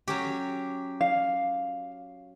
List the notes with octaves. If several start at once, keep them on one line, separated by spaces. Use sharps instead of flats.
F#3 C#4 G4
F5